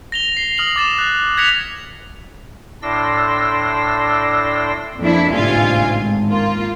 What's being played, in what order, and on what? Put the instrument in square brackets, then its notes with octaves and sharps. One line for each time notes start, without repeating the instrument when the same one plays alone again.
[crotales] A#6 F7 G7
C7
D#6 F6 F#7 G7
D6 A6 E7
F#6
F#6 G#6 A#6 B6 C#7 F7
[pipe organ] A2 D4 D5 C6 E6 A#6
[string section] F2 A#3 D4 E4
A1 D2 G#2 C3 F4 G#5
G#1
A#3 F4